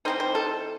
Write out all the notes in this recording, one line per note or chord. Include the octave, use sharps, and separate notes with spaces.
E3 C4 D#4 C5
C5
A4